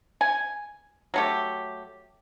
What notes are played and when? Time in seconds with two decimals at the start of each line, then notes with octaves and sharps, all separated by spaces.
0.21 G#5
1.14 F#3 A3 G4